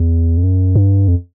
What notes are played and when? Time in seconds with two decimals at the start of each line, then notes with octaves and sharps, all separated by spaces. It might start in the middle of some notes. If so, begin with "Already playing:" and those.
Already playing: E2
0.37 F2
0.43 F#2
0.75 G2
1.08 F2